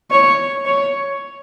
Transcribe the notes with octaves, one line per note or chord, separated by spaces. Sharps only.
C#5
C#5